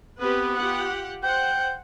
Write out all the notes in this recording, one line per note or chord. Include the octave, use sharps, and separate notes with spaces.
B3 C4 G4 B4
F4 G4 F#5
C5 F#5 G5